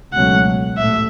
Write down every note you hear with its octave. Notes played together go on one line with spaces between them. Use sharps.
C#2 B2 F#3 A3 C#4 F#5
A1 A2 A3 E5